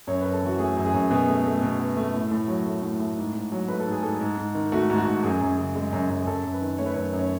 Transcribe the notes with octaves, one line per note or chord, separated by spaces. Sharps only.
F#2 C#5
B4
F#2
A4
E3 F#4
A3 G#4
F#2
G#4
F#2
B2 G#4
A3
A3
B2
B2
A3
A2
A2
F#3
A3
A2
A2
G#2
G#2
F#3
A3 B4
A4
G#2 G#4
G#2 A4
G#2
G#2
D#3
A3 F#4
G#2
F#4
G#2
F#2 G#4
F#2
C#3
G#3
F#2
F#2
G#4
F#2 A4
F#2
B4
D#3
A3 C#5
B4
F#2 C#5
F#2
C#5